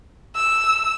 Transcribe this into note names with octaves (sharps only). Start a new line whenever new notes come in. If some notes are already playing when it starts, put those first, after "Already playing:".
E6